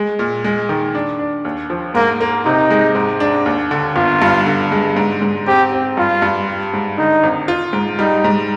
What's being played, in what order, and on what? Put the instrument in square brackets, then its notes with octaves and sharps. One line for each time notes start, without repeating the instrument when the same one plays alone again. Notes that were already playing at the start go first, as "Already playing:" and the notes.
Already playing: [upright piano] G#3
A#2
G#3
D#3
D4
D4
D#2
F3
[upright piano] G#2 [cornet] A#3
[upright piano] A#3
[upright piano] C3 [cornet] D#4
[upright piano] G#3
G#2
D4
D#2
D3
[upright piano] G1 [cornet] F4
[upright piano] G2
D3
G#3
G#2
G#2
[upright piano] C4 [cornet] G4
[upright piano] C4
[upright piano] G2 [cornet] F4
[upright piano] G2
G3
G#2
[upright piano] D3 [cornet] D#4
[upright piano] G#1
F4
G#2
[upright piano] G3 [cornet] D#4
[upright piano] G#2